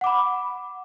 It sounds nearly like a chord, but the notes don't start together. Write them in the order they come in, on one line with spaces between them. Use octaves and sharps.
F#5 D6 B5